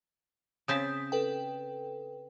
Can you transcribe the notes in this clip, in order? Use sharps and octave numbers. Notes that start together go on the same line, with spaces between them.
C#3 C4 A5 D#6 G6 B6
A4 B4 G5